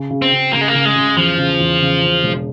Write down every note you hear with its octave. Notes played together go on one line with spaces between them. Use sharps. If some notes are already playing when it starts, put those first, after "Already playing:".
Already playing: C#3
C#3
C4
C#3
C#3 A#3
G#3
A#3
C#3
G#3
C#3
E2 F3
C#3
E2
C#3
C#3
E1